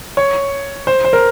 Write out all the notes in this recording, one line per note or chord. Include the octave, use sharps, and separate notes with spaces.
C#5
C5
C5
A#4